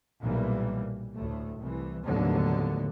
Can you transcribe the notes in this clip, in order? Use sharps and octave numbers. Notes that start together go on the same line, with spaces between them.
B1 A#2 E3 G3 A#3
D2 A2 A3
C2 E3
F1 D#2 A2 D3 F#3 B3